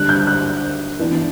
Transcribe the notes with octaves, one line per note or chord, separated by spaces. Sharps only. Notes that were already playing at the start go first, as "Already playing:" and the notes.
Already playing: D3 G3 D4 F#6
G6
F#6
E3 B3 D4